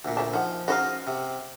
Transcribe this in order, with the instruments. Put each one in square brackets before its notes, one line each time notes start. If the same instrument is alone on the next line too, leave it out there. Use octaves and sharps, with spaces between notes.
[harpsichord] D2 A#2
[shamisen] C5 E5 A5
[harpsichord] F3 [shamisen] D#4 F#5
[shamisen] C#3 D#4 C5 [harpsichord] F#4 D#5 F5
[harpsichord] C3